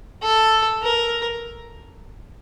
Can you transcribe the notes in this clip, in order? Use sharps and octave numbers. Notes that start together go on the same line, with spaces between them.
A4
A#4